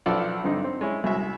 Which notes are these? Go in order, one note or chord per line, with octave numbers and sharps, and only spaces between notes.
B1 F3 A4 D5 F#5
G2 D3 C4 D#4
C4
G#3 C#4 E4
C2 G#3 F#4 E5